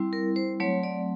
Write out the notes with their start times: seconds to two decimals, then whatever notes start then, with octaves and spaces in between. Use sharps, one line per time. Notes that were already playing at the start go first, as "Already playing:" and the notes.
Already playing: G3 C4 E4
0.13 A#4
0.36 C5
0.60 F#3 A3 C4 C#5
0.83 D5